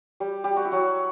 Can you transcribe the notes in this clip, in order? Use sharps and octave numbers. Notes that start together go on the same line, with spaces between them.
G3 G4
G3 G4
F#4
E4
F#3 F#4